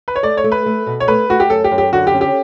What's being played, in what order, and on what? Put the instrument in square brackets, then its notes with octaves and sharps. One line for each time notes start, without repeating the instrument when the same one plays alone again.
[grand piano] B4
C#5
[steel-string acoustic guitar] A3 [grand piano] D5
[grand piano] C#5
[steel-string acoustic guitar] A3
[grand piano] B4
[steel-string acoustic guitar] A3
B2
[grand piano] C#5
[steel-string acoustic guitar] A3 [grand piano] B4
[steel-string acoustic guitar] A3 [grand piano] F#4
[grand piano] G4
[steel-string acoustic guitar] F#2 [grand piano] A4
[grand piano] G4
[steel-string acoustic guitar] F#2
[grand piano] G4
[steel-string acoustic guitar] D3 [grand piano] F#4
[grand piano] G4
[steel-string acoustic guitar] C#4
[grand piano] G4